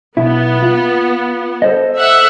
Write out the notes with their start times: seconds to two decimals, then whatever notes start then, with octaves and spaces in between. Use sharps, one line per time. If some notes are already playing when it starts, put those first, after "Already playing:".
0.17 B1 B3 E4
0.63 F4
1.62 A4 C5 D#5
1.95 E5 F#5